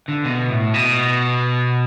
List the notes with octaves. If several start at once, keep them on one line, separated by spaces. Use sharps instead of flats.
D3
B2
A2
B2